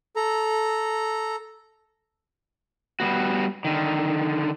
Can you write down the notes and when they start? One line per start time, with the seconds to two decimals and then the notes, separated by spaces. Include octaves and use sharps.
0.16 A4 A#5
3.00 G3 G#3 B3 F#4
3.65 D3 D#3